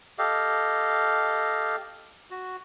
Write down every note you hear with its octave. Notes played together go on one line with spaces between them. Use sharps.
G4 A4 D#5 F5
F#4